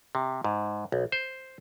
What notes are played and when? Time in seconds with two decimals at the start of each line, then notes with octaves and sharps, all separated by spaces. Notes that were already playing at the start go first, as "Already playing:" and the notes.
0.15 C3
0.44 G#2
0.92 B1
1.12 C5